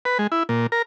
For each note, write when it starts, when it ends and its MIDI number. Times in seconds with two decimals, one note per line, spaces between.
0.05 0.18 71
0.19 0.27 56
0.32 0.43 64
0.49 0.67 46
0.72 0.82 70